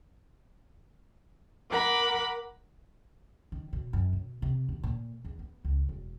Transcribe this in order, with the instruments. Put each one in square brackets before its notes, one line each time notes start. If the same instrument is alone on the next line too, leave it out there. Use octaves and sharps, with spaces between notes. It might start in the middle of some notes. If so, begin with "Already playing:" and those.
[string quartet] A#4 F#5 B5 D6
[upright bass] D#3
B2
F#2
B2
C3
D#2
A#2
E2
B3
C#2
E1